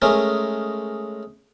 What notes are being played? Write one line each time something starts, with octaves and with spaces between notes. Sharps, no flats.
G#3 A3 C#4 A#4